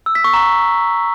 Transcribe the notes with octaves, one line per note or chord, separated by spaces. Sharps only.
E6
B6
C#6
A#5